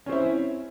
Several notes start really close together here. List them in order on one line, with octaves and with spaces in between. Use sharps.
C#4 C4 E4